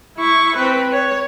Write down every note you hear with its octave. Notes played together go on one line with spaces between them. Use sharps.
E4 C#6
C4 B4
C#5